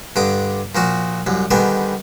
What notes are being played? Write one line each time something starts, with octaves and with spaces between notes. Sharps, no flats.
G2 D3 D6 D#6
A#2 F3 F#4
C2 F#2
D3 D#3 G3 B3 G#5